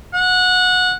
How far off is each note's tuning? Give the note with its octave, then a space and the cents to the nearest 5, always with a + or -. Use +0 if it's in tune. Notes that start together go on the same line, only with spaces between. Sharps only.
F#5 -20